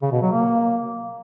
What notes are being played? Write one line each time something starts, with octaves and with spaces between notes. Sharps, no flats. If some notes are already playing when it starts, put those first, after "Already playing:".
C#3
B2
F#3
A#3